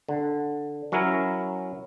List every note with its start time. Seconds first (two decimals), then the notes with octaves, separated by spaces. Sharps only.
0.09 D3
0.92 F#3 C#4 E4 A#4